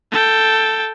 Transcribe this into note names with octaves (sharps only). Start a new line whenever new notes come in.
A4 G5